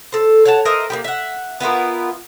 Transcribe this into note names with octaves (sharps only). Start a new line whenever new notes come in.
A4 C5
C#5 F#5 A5
A#4 C5 D#5 E5
A#3 B3 G4
E5 F#5
B3 E4 F4 A#4